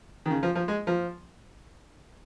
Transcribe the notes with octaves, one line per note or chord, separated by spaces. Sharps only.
D#3
C#3
F3
F3
G#3
F3